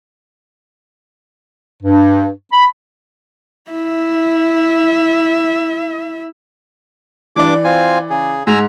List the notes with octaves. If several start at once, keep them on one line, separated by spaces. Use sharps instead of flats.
G2
B5
E4 E5
G2 E3 D4 D5 D6
C4 F4 G#5
C#3 G#4
G#2 G#5 A#5 E6 F7